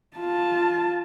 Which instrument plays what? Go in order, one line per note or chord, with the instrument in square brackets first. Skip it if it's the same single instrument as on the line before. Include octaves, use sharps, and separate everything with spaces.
[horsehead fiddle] F4 A5